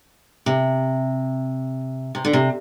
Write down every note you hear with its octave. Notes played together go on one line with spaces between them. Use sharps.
C3
C3
D3
C3